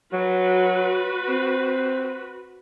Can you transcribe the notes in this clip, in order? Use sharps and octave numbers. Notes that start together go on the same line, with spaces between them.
F#3 F#4 B4
C4